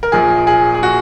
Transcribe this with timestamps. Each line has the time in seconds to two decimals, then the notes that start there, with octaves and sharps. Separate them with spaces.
0.03 A#4
0.12 A#1 A#2 F3 G#4
0.47 G#4
0.74 G#4
0.83 F#4